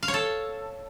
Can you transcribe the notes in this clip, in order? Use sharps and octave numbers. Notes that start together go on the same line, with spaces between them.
F5
C#5
A4